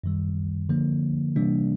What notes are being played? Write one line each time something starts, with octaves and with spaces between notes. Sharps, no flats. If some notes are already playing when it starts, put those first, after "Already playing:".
F#2 D#3 G3
D3 F3 A#3
C3 E3 G3 A#3 D4